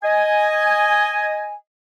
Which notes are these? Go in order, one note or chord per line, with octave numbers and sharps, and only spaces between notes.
D#5 G#5